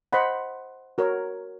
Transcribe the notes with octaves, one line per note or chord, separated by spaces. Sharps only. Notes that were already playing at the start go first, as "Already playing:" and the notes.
C5 D#5 F#5 B5
F#4 A#4 C#5